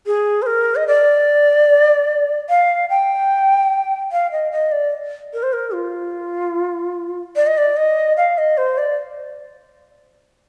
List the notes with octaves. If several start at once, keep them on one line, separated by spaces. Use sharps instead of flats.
G#4
C5
A#4
D#5
D5
F5
G5
F5
D#5
D#5
D5
A#4
C5
A#4
F4
D5
D#5
D5
D#5
F5
D#5
C5
D5